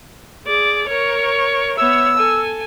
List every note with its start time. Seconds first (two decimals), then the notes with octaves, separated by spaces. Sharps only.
0.46 G#4 D5
0.88 A#4 C#5 C#6
1.77 B3 C#5 E5 E6
2.18 A4 G#5